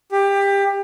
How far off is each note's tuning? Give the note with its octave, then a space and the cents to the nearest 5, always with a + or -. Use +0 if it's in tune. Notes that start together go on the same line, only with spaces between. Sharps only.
G4 +20